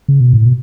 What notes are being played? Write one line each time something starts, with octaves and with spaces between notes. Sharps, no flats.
C#3
B2
A2
B2